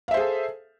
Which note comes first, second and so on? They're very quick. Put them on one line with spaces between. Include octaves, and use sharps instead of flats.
F5 E5 C5 G#4 A4